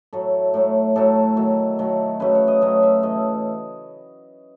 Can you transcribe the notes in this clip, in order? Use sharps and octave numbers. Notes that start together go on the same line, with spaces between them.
A2 F#3 A3 A4
A2 F#3 A3
A2 F#3 A3 A4
D#3 F#3 A3
D#3 F#3 A3
C#3 F#3 A3 B4
C#5
D#5
C#3 F#3 A3 D#5
E5
A2 E3 A3 D#5